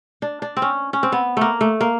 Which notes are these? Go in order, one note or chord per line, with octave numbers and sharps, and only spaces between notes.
D4
D4
C4
C#4
C#4
C4
B3
A3 A#3
A3
A#3